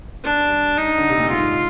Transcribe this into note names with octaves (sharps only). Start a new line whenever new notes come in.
G2 D4
G2
D#4
D3
C3
A#2
G#2 F4